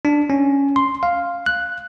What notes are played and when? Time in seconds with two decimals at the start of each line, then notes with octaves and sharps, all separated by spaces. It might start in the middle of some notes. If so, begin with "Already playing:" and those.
0.05 D4
0.30 C#4
0.76 C6
1.03 F5
1.46 F#6